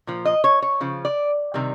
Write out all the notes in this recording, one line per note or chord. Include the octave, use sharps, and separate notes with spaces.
A#2 F3
D#5
C#5
C#5
C#3 F3
D5
C3 D#3 G3